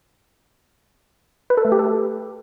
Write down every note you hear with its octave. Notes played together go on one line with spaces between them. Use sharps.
B4
A4
A3
G4
A4